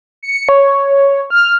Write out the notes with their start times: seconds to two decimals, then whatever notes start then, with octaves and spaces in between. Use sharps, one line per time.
0.23 C#7
0.49 C#5
1.30 F6